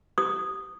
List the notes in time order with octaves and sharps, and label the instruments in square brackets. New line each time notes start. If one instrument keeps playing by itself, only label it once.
[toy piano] D#6